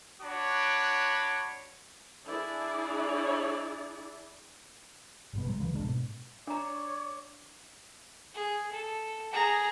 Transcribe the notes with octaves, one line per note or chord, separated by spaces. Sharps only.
D4 F#4 C#5 B5 D6
D4 E4 G#4 D5
G1 G#2 B2
C2 F#3 G#3
C#2 C#3 E3
A1 G#3 A#3 D4
G#2 B2
D4 C#5 D5 A#5
G#4
A4
G#4 A#5